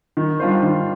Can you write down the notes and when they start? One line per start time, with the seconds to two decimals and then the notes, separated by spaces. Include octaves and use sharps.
0.17 D#3
0.40 G3 D4 F4 C5
0.63 D#3